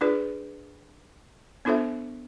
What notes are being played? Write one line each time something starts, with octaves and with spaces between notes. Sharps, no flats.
D4 F4 G#4 B4 D5
B3 D4 F4 A4 C5 E5